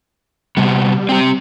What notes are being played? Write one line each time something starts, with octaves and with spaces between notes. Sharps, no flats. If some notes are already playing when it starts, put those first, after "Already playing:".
C3 G3 B3
C4 G4